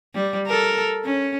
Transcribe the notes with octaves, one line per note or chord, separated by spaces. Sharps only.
G3
A4 A#4
C#4